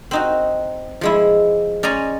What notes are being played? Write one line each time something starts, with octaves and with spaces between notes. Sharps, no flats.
C4 D#4 F#4
F3 G#3 E4
C#4 D5 D#5 G#5 A#5 C6